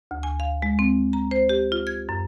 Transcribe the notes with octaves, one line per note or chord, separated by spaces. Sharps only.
D2
G#5
F5
G#3
C4
A#5
C5
G4
F4
G#6
F#2